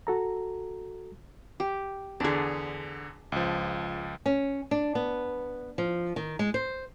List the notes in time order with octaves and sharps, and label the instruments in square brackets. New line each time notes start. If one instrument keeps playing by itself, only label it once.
[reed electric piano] F#4 A4 A#5
[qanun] G4
[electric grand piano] E2 D3 [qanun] D4 G#4
[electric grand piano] C#2 F3
[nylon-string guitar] C#4
D4
B3
F3
D#3
G#3
C5